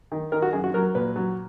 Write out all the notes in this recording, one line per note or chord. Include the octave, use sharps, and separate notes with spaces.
D#3
D#3 A#4
F#4
F#2 G#4
F#4
F#3 A#4
A#2 B4
F#3